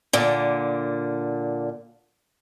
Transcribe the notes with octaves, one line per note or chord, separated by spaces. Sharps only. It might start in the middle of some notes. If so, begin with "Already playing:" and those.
A#2 D3